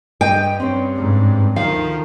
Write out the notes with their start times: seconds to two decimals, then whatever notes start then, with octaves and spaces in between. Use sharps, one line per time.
0.21 G2 D#5 G5
0.60 C4 C#4
0.96 G#2
1.56 D2 D#3 F3 F5